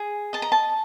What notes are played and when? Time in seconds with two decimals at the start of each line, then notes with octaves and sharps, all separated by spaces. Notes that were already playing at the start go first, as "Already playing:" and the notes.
Already playing: G#4
0.33 D#5 A5
0.42 A#5
0.52 A5